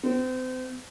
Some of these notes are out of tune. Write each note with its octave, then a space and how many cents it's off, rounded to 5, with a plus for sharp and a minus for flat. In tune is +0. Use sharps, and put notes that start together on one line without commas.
C4 -35